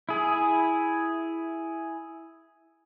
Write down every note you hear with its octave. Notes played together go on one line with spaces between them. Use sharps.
E4 G#4